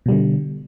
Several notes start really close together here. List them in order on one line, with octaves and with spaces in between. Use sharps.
B2 G3 D3